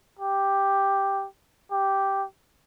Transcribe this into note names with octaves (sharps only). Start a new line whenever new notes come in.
G4
G4